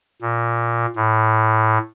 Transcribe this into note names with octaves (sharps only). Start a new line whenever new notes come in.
A#2
A2